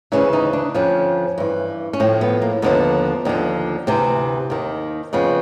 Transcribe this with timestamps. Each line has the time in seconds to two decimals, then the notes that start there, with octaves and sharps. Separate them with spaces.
0.12 D2 C#3 E3 C#4
0.33 D#4
0.53 D4
0.74 F2 D3 F3 C#4
1.38 G2 E3
1.93 C#4
2.00 A2 F3 C4
2.21 B3
2.42 A#3
2.62 D#2 D3 F3 B3
3.25 D#2 D3 F3
3.87 D2 C3 E3 C4
4.50 D#2 D#3
5.13 F2 C#3 F3 B3